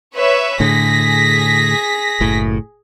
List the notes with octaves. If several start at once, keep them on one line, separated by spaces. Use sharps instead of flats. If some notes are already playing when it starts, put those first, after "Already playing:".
B4 C#5 E5
A2 D3 G#4 A#6 B6
F#1 A2